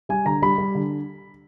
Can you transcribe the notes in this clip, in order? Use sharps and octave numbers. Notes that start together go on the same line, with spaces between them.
G3 G#5
D3 A#5
G3 B5
G3
D3